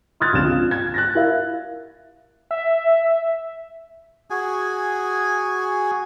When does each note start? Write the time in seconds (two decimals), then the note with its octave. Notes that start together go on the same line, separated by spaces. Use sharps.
0.20 C6 D#6 F6 F#6 G#6 A6
0.33 C#2 D3 F3 C4 E7
0.46 F4
0.71 G#6
0.94 F#6 A6 A#6
1.15 E4 A#4 E5 F5
2.51 E5
4.30 F#4 G#4 G#5